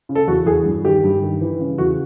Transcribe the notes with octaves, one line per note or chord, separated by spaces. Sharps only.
C#3
A4
E2 F#4
E2 G#4
G2
D#3 G4
G2
D#3
E3
C#3
E2 F#4